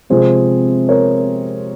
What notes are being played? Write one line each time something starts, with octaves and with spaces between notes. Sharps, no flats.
C3 F3 G#3 C4 G#4 C5
A#4 C#5